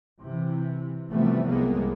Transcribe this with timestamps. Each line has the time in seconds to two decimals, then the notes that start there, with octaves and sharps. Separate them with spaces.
0.21 C3 E3
1.10 C3 E3 F3 G3 A3 B3
1.45 C2 C3 F#3 G#3 A#3 B3